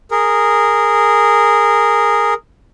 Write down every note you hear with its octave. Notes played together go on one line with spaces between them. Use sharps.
G#4 A#4